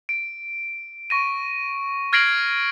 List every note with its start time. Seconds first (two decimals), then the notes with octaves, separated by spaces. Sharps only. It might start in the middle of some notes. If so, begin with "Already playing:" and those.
0.09 D7
1.10 C#6 A#6 D#7
2.13 F6 G#6 A#6 C7 D7 F#7